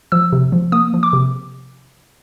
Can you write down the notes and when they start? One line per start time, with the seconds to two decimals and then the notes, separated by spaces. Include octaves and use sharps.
0.12 F3 E6
0.33 C3
0.52 F3
0.72 A#3 D#6
0.94 F3
1.03 D6
1.13 C3